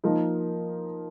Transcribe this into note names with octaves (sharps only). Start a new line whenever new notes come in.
F3 A#3 D#4 A#4